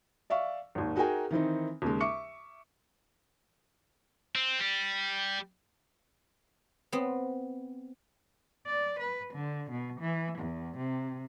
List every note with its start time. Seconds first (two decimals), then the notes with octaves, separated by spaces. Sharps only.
0.30 D5 E5 F5 C#6
0.75 G#1 D#2
0.96 D#4 F#4 G#4 A#4 G5 G#5
1.31 D#3 E3 C4 D#4
1.82 D#2 C#3 G#3
2.01 E5 C#6 D6 C#7
4.35 C4
4.60 G3
6.92 B3 C4
8.67 D5
9.00 B4
9.33 D3
9.71 B2
10.00 E3
10.39 E2
10.77 C3